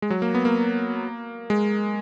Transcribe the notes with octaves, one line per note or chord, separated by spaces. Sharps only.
G#3
F#3
A#3
B3
A#3
G#3